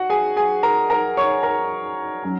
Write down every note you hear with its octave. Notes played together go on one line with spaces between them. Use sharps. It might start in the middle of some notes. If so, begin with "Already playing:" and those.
Already playing: F#4 F#5
G#4 G#5
G#4 G#5
A#4 A#5
A#4 A#5
C#5 C#6
A#4 A#5
F#3 C#4